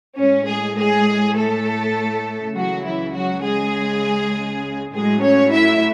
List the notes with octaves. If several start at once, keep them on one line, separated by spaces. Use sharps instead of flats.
A2 G#3 C#4
G#3 G#4
G#3 G#4
A3 A4
C#2 C#3 E3 F#3 F#4
E3 E4
F#3 F#4
G#3 G#4
A2 F#3 G#3 A3 G#4
C#4 C#5
E4 E5